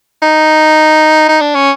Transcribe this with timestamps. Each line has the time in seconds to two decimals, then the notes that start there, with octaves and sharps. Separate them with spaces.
0.23 D#4
1.29 D#4
1.41 D4
1.55 C#4